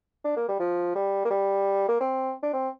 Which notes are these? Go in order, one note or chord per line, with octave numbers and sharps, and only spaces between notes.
D4
A#3
G3
F3
G3
A#3
G3
A#3
C4
D4
C4